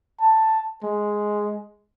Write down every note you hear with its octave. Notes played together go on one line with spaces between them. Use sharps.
A5
G#3